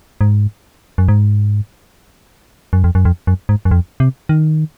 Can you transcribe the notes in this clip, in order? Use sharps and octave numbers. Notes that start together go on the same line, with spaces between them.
G#2
F#2
G#2
F#2
F2
F#2
F2
F#2
G#2
F#2
F2
C3
D#3